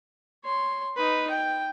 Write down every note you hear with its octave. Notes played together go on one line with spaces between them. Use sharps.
C#5 C6
D#4 B4
G5